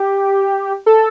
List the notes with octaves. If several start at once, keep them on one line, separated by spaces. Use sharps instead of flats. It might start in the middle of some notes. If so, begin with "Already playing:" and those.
Already playing: G4
A4